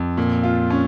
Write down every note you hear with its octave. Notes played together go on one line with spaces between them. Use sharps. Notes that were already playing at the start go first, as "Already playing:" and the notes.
Already playing: F2
A#2
F4
C#4